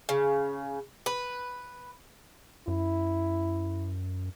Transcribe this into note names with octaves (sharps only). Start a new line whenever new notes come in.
C#3
B4
F#2 E4